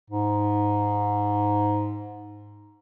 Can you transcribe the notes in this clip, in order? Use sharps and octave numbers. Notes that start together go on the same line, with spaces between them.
G#2